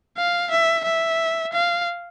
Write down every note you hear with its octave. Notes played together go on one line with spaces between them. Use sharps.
F5
E5
E5
F5